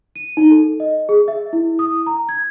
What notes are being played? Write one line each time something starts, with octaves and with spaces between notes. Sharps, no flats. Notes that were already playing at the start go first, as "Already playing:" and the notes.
D#7
D#4
A4
D#5
G#4
E5
E4
D#6
A#5
G#6